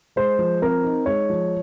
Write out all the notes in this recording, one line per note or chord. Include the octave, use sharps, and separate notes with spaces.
G#3 C5
F3
C4 A#4
D#4
G#3 C#5
F3